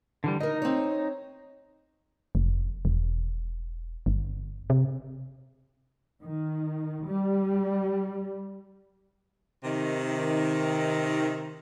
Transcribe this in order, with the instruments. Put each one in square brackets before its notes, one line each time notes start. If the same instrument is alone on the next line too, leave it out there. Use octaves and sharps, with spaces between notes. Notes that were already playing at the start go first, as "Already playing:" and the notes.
[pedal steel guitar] D3 E3 G3
[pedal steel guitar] D#4 [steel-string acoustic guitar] A#4 D#5
[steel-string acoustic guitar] C4 C#5
[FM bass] F1
E1
G1
C3
[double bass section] D#3
G3
[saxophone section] C3 D#3